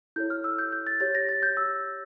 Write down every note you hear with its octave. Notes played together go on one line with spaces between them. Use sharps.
E4 A4 C#5 G6
F6
E6
G6
G6
A6
G4 C#5 A6
A#6
A6
G6
E6